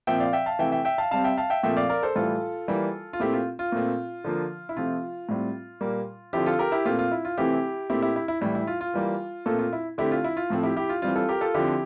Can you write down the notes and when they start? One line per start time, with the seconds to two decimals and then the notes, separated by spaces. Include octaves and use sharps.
0.07 A#2 F3 C4 E5 G5
0.20 D5 F5
0.33 E5 G5
0.46 F5 A5
0.59 C3 E3 A3 E5 G5
0.72 E5 G5
0.85 E5 G5
0.98 F5 A5
1.11 C3 G3 C4 F5 A5
1.24 E5 G5
1.37 F5 A5
1.50 E5 G5
1.63 A#2 F3 A3 C4 E5 G5
1.77 D5 F5
1.89 A#4 D5
2.03 A4 C5
2.15 A2 E3 G3 F4 A4
2.68 E3 G3 A#3
3.13 F4
3.20 A#2 A3 C4 E4 G4
3.33 F4
3.59 F4
3.72 A#2 A3 C4
4.24 D3 F3 A#3
4.69 E4
4.77 C3 F3 A3 C4 F4
5.29 A2 G3 C4
5.81 A#2 G3 A#3
6.33 D3 F3 C4 E4 G4
6.46 F4 A4
6.59 G4 A#4
6.72 E4 G4
6.85 A#2 A3 C4 F4
6.99 F4
7.11 E4
7.25 F4
7.37 C3 E3 A3 C4 E4 G4
7.90 A#2 A3 C4 E4 G4
8.02 E4 G4
8.16 E4
8.28 E4
8.41 A2 E3 G3 E4
8.55 E4
8.67 F4
8.81 F4
8.94 E3 G3 A#3
9.46 A#2 A3 C4 F4 A4
9.59 F4
9.73 E4
9.98 D3 A3 C4 E4 G4
10.12 F4
10.24 E4
10.37 F4
10.50 A2 F3 C4 A4
10.63 E4 G4
10.76 E4 G4
10.89 F4
11.02 E3 G3 C4 F4
11.16 F4 A4
11.29 G4 A#4
11.41 F4 A4
11.54 D3 F3 C4 E4 G4